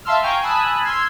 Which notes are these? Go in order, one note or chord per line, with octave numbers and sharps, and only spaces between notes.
E5 F5 A5 C6 E6 F6
F5 G5 G#5 A#5 C#6 G6
G#5 A5 B5 D#6 E6 F#6
C6 E6 F6 G#6 C7